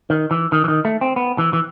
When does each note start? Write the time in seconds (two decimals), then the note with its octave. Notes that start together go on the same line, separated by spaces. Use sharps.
0.10 D#3
0.31 E3
0.52 D#3
0.64 E3
0.68 D#3
0.85 A3
1.01 C4
1.16 B3
1.38 E3
1.53 E3